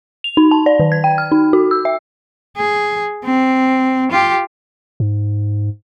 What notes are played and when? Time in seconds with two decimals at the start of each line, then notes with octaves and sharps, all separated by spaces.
0.24 F7
0.37 D#4
0.51 A5
0.66 D5
0.80 D#3
0.92 G#6
1.04 G5
1.18 F6
1.32 D#4
1.53 F#4
1.71 E6
1.85 E5
2.57 G#4
3.24 C4
4.11 F4 G4
5.00 G#2